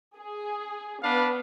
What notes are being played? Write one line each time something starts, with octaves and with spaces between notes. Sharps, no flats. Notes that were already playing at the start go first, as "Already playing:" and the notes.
G#4
B3 D4 B4 F5